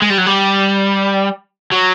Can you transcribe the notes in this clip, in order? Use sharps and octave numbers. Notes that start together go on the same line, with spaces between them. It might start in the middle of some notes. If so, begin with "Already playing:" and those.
G#3
G3
F#3
G3
F#3